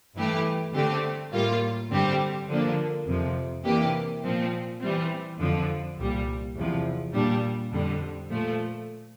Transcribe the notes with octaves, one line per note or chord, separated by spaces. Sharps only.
G2 E3 A3 E4 G4
D3 A3 C4 G4
A2 G3 A#3 F4
G2 D3 G3 C4 G4
D3 F3 A#3 D4
F2 C3 F3
C3 E3 A#3 D4 G4
A#2 F3 C4
E3 G3 C4
F2 D3 F3
C2 A#2 G3
E2 C3 F3
A#2 G3 D4
F2 D3 G3
A#2 F3 A3